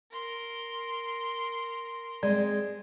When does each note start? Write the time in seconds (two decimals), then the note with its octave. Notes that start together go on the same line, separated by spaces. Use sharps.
0.11 A#4 C6
2.23 G#3 C4 D5